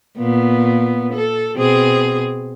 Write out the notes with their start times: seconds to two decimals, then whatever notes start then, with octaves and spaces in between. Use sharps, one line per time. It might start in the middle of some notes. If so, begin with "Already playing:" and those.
0.18 A#2 B3
1.13 A4
1.57 B2 C4 G#4